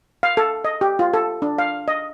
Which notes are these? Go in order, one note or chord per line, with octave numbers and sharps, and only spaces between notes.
F5
A4
D#5
G4
F4
A4
D4
F5
D#5